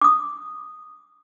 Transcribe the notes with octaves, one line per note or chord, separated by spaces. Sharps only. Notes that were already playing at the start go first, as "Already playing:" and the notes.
D6 D#6